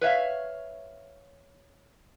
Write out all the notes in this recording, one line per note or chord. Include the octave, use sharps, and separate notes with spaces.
B4 C#5 E5 F5